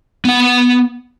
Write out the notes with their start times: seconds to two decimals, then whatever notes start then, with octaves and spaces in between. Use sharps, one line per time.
0.25 B3 F#5